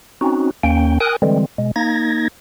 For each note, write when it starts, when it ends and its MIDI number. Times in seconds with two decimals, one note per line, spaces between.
0.21 0.51 60
0.21 0.51 61
0.21 0.51 63
0.21 0.51 66
0.63 0.99 39
0.63 0.99 58
0.63 0.99 61
0.63 0.99 79
1.00 1.16 70
1.00 1.16 79
1.00 1.16 80
1.00 1.16 87
1.00 1.16 90
1.22 1.46 50
1.22 1.46 52
1.22 1.46 55
1.22 1.46 56
1.22 1.46 60
1.58 1.71 47
1.58 1.71 56
1.76 2.28 58
1.76 2.28 63
1.76 2.28 92
1.76 2.28 94